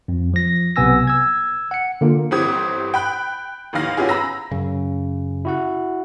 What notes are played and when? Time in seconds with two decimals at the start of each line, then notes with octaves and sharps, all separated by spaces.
0.08 F2
0.34 F3 A#6
0.76 B1 C3 B3 G#5 E6 A#6
1.07 E6 G#6
1.71 F#5 C#7
2.01 D3 A#3 F4
2.31 G1 E3 C4 G4 D#6 G#6
2.94 G5 B5 F#6
3.73 A1 D#2 D#3 E3 F5 A#6
3.97 B3 C#4 E4 F4 G4 G#4
4.09 A#5 B5 E6 A#6
4.52 F#2 C#3
5.45 E4 F#4 F#5